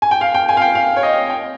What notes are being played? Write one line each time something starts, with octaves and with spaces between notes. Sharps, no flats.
G#5
G5
F5
G5
G#5
F5
G5
F5
C#5
D#5
G5